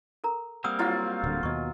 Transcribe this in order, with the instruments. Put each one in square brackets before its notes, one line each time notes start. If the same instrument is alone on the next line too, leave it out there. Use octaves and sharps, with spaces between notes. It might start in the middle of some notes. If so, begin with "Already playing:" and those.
[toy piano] A4 A#4 A#5
[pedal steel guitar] G3 A#3 C4 [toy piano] F#5 D#6
[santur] F#3 F4 [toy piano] E4 E5 F#5
[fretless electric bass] D1 D3
[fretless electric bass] D#2 B2 [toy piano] D#5 C#6